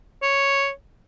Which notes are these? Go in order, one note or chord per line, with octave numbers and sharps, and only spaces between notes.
C#5